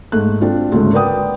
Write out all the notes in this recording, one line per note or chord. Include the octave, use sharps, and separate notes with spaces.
G#2 A3 F#6
C4 D4 F4
D2 G#2 C#3 G#3 A3
A#4 B4 D5 F#5 G5 D#6